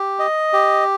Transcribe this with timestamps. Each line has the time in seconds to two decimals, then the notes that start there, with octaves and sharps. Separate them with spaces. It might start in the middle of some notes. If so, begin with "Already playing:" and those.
Already playing: G4
0.19 D#5
0.53 G4